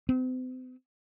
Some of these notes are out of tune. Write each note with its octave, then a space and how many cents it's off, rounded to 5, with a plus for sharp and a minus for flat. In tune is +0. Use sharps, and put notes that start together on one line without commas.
C4 -40